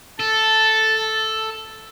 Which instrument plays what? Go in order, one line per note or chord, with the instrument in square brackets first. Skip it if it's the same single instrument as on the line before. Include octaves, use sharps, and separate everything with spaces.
[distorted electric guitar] A4 [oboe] A5